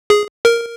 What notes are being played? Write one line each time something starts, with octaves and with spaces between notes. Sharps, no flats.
G#4
A#4